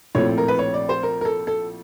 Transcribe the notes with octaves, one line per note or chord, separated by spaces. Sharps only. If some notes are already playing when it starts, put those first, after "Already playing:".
A#1 A2 F3 A3 C4 C#5
A#4
B4
C#5
D5
C5
A#4
A#4
A4
A4